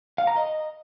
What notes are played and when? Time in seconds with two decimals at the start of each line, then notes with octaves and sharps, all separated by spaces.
0.18 F5
0.27 A#5
0.36 D#5